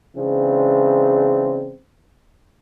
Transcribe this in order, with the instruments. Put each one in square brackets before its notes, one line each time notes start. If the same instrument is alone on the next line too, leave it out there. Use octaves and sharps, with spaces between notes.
[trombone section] C#3 E3 G#3 C4 D4